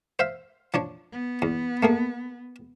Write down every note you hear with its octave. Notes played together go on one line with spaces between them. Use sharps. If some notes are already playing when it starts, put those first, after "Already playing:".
C5 E5 F5
F3 D4 C#5
B3
E2
A3 A#3 G#4